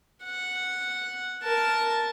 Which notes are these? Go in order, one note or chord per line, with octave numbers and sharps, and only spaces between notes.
F#5
A#4 A5